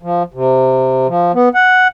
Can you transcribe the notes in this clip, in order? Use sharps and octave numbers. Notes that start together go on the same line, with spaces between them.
F3
C3
F3
B3
F#5